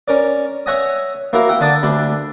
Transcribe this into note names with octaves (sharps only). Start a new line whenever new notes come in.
C#4 A#4 D5
C#5 E5 F#5 G#5 A#5 D#6
A#3 E4 F#4 A#4
E5 F#5 G5
D3 D4 D5 A5 D#6
D2 D4 B5